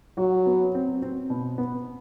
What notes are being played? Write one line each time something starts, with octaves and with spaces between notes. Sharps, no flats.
F#3 F#4
B3
C4
C4
B2
B3